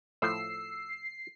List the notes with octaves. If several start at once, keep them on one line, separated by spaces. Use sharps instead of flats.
A2 F3 A3 E6 C7